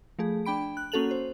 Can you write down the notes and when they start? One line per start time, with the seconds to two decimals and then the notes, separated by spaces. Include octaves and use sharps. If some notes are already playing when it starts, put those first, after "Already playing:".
0.19 F3 A3 G#4
0.46 D4 G5 B5 D7
0.77 F#6
0.92 A#3 C#4 F#4 A4 F7 F#7
1.11 C5